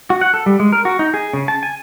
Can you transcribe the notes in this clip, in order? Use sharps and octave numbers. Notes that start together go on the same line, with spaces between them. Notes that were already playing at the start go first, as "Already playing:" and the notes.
F#4
F#5
A4
G3
G#3
A#4
F#4
D#4
G#4
C#3
A5
G#5